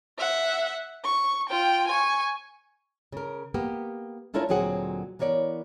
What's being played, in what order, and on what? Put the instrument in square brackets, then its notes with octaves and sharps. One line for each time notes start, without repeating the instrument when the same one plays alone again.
[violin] E5 F#5
C#6
F4 G5
G#5 C#6
[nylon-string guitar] C#3 A#4
A#3 B3 G4
C#4 D4 E4 F4 A#4 C#5
D2 A#2 F#3 C4 G#4 F#5
E3 B3 A#4 C#5 D5